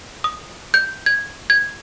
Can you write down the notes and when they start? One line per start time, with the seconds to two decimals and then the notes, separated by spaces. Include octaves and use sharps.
0.24 D#6
0.74 G6
1.06 G#6
1.50 G#6